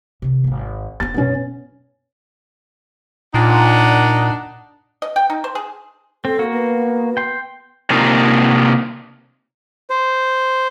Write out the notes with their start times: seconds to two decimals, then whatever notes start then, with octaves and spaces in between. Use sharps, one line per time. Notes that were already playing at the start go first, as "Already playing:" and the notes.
0.22 C3 D#3
0.44 D#1 G#1
1.00 B3 C4 A6
1.14 F#2 B2 B3 C#4
3.34 A#2 D4 D#4 F#5
5.02 D#5
5.16 G5
5.30 D#4
5.44 C5
5.55 G#4
6.25 C4 A4
6.39 A#3 F#4
6.53 B3
7.17 G5 C6
7.90 C3 A#3 D4 D#4 F4
9.90 C5